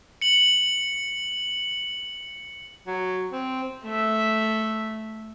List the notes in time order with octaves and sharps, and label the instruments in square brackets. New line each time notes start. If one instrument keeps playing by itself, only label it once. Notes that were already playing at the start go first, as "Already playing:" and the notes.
[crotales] C#7 F#7
[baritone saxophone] F#3
C4
[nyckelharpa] A3 E5